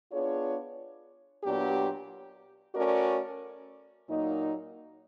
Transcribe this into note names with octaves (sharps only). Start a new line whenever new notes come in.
B3 D4 F4 G#4 C#5
A#2 F#3 B3 D4 G4
A3 C#4 F#4 A#4 D5
A#2 F#3 A#3 D#4